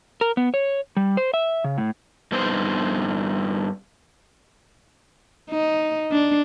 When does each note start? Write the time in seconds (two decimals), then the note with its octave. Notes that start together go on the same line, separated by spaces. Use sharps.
0.21 A#4
0.37 B3
0.54 C#5
0.97 G3
1.17 C5
1.34 E5
1.64 C#3
1.78 A2
2.32 G2 B3 C4 D#4 G#4 C5
5.51 D#4
6.12 D4